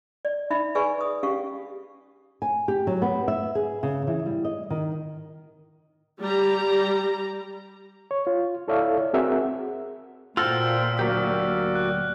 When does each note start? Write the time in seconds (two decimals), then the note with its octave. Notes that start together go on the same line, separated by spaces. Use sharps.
0.25 D5
0.50 D#4 E5 B5
0.75 G#4 B4 D5 G#5 B5 C#6
1.01 D#6
1.23 C#4 G4 F5 C#6
2.42 G#5
2.68 G4
2.87 F#3
3.02 B3
3.28 E5
3.55 G#4
3.83 C#3
4.07 E3
4.26 G3
4.45 D#5
4.70 D#3
6.21 G3 G4 A#5
8.11 C#5
8.27 F4
8.68 E4 A4 C#5 D5 E5 F5
9.13 C4 F#4 G#4 A#4 E5 F#5
10.37 A#2 F4 F#4 A4 C5 G5 E6 F6
10.99 D2 F#3 A#3 F#4 G4 D5
11.75 F#6